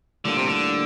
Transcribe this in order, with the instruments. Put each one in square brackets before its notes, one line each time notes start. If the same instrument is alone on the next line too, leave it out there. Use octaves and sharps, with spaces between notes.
[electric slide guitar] A2 G3 A#3 D4 F4 [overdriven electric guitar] D3
[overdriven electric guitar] C3
D3